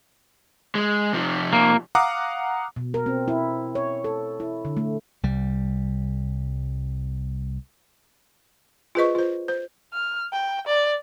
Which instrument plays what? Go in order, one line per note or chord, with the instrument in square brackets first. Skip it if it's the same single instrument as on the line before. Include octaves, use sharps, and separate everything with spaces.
[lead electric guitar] G#3
C3 F3
[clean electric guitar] A#3
[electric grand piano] F5 F#5 A#5 D6 D#6
[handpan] B2
A#4
C4
E4
C#5
A4
E4
D3
A3
[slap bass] C2 G3
[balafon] F4 G#4 B4 C5 D#5 C#6
F4 C5
C5
[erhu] F6
G5
D5